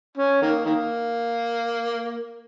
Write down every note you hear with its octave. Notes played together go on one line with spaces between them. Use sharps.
C#4
D#3 A#3
D#3 A#3